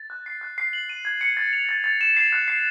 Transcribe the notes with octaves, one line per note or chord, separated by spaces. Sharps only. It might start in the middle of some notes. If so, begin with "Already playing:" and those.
Already playing: A6
F#6
C7
F#6
C7
F#7
D#7
G#6
C#7
A6
F7
A6
A6
E7
C7
F#6
C7